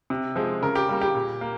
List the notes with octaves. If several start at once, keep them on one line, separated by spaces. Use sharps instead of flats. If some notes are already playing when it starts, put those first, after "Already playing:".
C3
F3 G#3
C#3 A#4
G4
G3 A#3
G4
A#2
A#3